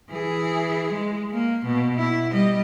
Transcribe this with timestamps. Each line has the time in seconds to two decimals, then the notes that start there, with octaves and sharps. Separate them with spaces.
0.11 E3 G#4
0.92 G#3
1.32 A#3
1.65 B2
1.97 E4
2.31 G3 D#5